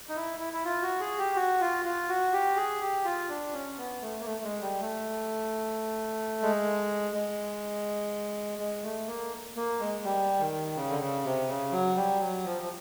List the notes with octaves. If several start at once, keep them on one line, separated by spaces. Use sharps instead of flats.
D#4
E4
E4
E4
F4
F#4
G#4
G4
F#4
F4
F4
F#4
G4
G#4
G4
F4
D4
C#4
B3
A3
A#3
A3
G#3
G3
A3
G#3
G#3
G#3
A3
A#3
A#3
G#3
G3
D#3
C#3
D3
C#3
C3
C#3
F#3
G3
F#3
F3
F3